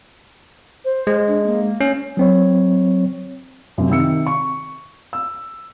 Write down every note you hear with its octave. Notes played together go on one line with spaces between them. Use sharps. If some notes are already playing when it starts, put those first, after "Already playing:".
C5
G#3
D4
A#3
C#4
F#3 C4 C#5
F#2 C3
C3 D#3 E6 C#7
C#6
E6